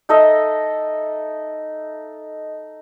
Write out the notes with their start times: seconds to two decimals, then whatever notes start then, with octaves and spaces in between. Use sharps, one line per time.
0.09 D#4 A4 D#5 E5